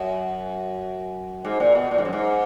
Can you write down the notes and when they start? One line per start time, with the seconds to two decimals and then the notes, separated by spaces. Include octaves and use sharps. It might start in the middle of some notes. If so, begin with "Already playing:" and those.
Already playing: F#2
1.45 G#2
1.60 A#2
1.75 B2
1.91 A#2
1.98 G#2
2.05 F#2
2.13 G#2